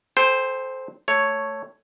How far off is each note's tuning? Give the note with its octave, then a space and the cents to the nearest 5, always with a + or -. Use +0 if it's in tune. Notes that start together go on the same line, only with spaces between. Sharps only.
A4 -25 C5 +0 G5 +20
A3 +5 C#5 +0